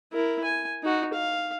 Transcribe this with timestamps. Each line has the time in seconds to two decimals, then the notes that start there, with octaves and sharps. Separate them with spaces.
0.13 E4 A#4
0.44 G#5
0.83 D#4 F#4
1.13 F5